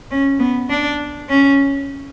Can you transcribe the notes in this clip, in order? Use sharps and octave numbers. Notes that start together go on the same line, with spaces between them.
C#4
B3
D4
C#4